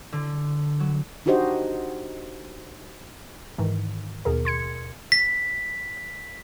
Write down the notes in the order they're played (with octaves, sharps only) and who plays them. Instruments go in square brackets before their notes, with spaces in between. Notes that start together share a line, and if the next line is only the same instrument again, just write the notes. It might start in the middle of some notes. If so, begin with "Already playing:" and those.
[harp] D3
F#3
[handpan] D4 D#4 F#4 G4 C5 D#5
[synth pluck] G#2 D#3 E3
D#2 B2 G#4 A#4
C6 G#6 C#7
[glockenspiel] B6